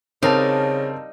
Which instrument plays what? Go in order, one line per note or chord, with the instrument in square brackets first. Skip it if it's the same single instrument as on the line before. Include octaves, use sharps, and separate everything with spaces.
[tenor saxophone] C#3 [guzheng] G3 D#4 F5 [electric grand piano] C4 A#4 A5